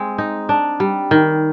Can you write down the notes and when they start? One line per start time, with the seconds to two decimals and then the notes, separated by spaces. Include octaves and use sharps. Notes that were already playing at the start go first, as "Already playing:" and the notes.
Already playing: G#3 C4
0.18 D#4
0.49 D4
0.80 G3
1.11 D#3